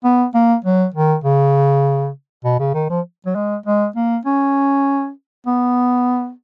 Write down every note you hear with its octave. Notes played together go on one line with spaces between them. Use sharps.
B3
A#3
F#3
D#3
C#3
B2
C#3
D#3
F3
F#3
G#3
G#3
A#3
C#4
B3